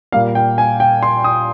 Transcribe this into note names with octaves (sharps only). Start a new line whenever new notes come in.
A#2 G3 A#3 F5
G5
G#5
G5
C6
D#6